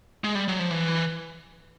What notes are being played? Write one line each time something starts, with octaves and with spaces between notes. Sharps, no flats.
G#3
G3
F#3
F3
E3